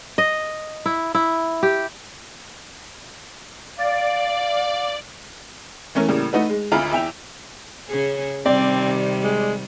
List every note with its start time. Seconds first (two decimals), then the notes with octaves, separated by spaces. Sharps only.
0.18 D#5
0.86 E4
1.15 E4
1.63 G4
3.78 D5 F5
5.95 E3 A3 C#4 A#4
6.08 A2 C#3 G3 A#3
6.33 A3 D#4 F#4 B4
6.49 G#3
6.72 G#1 D2 F4 E5 A#5 B5
6.91 E2 E5 G5 F7
7.87 C#3 C#4 G#4
8.46 C3 D#3 G3 C4 D5
9.24 G#3